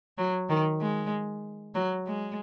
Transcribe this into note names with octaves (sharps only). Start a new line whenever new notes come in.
F#3
D#3
G#3
F#3
G#3